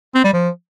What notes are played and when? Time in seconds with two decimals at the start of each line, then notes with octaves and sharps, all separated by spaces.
0.15 C4
0.24 G3
0.33 F3